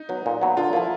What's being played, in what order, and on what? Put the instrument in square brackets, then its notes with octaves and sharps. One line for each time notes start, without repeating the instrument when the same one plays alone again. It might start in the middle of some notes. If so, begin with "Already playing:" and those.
Already playing: [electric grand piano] D#4
[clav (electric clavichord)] F#3 B3
A#2
F#3 B3
[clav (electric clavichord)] D3 [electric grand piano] F4
[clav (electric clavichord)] F3 A#3 [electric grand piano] E4